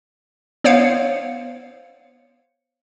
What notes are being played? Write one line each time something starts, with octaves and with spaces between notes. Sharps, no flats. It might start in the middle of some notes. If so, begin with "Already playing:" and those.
B3 C5 C#5 F5 C#7